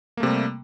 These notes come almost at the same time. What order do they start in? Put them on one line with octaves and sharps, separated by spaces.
A#3 A3 C3 G3